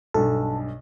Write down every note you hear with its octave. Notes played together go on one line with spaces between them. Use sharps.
B1 G2 A4